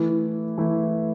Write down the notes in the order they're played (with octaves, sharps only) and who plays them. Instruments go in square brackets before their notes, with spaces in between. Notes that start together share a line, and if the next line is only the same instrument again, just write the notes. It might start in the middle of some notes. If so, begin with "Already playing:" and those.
Already playing: [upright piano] E3 A3 E4
E3 A3 E4